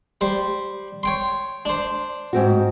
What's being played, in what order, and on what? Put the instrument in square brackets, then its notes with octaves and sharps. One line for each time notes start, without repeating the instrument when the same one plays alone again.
[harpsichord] G3 C5
C#5 G5 C6
D4 C5
[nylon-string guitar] G#2 C4 F#4